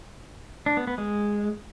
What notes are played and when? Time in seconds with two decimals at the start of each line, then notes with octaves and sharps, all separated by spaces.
0.66 D4
0.77 B3
0.87 B3
0.98 G#3